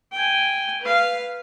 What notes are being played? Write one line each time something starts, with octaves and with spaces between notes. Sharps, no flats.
G5 G#5
B4 F5